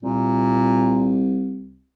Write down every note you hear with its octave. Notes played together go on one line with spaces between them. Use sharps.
C2 A#2